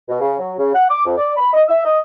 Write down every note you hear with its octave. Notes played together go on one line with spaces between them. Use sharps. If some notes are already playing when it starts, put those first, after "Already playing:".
B2
C#3
F#3
C#3
F#5
D6
F2
D5
B5
D#5
E5
D#5